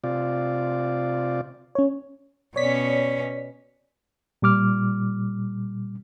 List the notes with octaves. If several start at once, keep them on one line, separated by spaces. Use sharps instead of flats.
C3 F4 D5
C#4 C#5
B2 C#4 C#5 D5 B6
A#2 G3 D6 F6